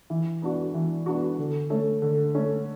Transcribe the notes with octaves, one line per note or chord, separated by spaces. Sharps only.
E3
B3 D4 F#4
E3
B3 D4 F#4
D3
A3 C#4
D3
A3 C#4